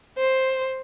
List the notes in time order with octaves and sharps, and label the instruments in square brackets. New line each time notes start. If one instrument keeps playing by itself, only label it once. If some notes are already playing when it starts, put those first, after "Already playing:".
[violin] C5